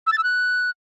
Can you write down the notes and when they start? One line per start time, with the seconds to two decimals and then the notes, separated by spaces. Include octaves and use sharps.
0.07 E6
0.12 A6
0.18 E6
0.23 F#6